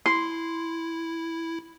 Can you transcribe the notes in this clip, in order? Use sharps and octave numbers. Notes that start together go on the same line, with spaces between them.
E4 C6